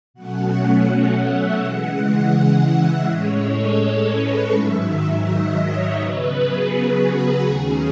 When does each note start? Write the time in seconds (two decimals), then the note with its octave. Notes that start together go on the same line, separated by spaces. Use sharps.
0.14 B2 F#3 A3 C#4 F#5
1.24 E5
1.60 C#3 E3 G#3 F#5
2.69 E5
3.05 A2 G#3 C#4 C#5
3.43 A4
4.15 B4
4.51 G#2 D#3 F#3 E5
5.25 D#5
5.60 C#5
5.97 C#3 F#3 B3 B4
6.34 G#4
7.06 F#4
7.43 D#2 D#3 A3 C#4 G#4